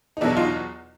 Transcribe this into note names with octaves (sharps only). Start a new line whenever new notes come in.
D#4
E2 B2 F#3 D4 E4
D#4 F4